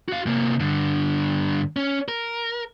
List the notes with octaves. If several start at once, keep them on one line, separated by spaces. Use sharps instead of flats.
F#4 F5
C3 A#3
G2 D3
C#4
A#4